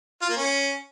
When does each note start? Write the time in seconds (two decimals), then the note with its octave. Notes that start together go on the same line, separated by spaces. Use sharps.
0.22 F4
0.29 A#3
0.37 C#4